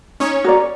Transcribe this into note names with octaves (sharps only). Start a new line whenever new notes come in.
C#4 D#4 C#5
F#4 A#4 D5